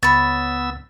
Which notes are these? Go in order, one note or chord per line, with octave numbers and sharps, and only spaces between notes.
C#2 B3 C#5 B5 E6 A6